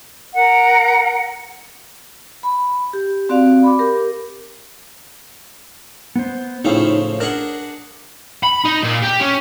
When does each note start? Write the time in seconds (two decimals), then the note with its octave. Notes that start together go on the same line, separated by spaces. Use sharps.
0.34 A#4 F#5
2.43 B5
2.93 G4
3.29 C4 F#4 D5 F5
3.63 B5 D6
3.79 G4 A#4
6.16 B3 C5
6.65 A2 C#3 F3 D#4 F5
7.20 D4 G#4 A#4 F#5
8.44 B5
8.65 D#4
8.84 A#2
9.03 G4
9.21 C#4